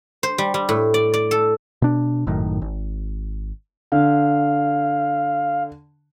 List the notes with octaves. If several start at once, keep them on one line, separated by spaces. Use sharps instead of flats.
C5
G3
G3
A2
D5
D5
A4
B2 D4
G#1 F#2 A2 D#3
G#1
D3 F5